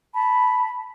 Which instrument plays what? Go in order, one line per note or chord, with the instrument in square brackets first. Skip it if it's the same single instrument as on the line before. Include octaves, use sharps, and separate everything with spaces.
[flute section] A5 B5